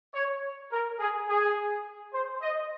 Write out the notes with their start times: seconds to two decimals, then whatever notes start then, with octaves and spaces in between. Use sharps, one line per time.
0.14 C#5
0.72 A#4
0.99 G#4
1.28 G#4
2.13 C5
2.42 D#5